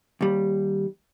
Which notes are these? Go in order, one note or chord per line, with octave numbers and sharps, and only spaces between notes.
D#2 G3